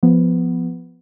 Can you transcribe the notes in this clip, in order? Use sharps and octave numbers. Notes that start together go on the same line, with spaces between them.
F3 B3